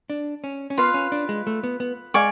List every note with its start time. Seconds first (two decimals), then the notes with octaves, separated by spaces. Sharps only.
0.10 D4
0.44 C#4
0.70 C#4
0.78 B3 F4 B4 F5
0.94 C#4
1.12 D4
1.29 G#3
1.47 A3
1.64 B3
1.80 B3
2.14 G#3 D5 F5 G#5 C#6